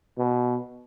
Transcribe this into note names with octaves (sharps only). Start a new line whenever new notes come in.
B2